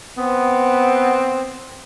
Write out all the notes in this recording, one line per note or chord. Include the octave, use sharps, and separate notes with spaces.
B3 C4